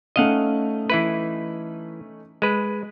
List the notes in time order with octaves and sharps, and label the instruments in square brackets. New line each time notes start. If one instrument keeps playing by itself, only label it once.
[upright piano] A3 C#4 D#4 [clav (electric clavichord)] D#5 F5 F#5
[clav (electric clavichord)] E3 E4 B4
G#3 B4